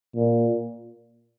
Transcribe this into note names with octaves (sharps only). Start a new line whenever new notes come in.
A#2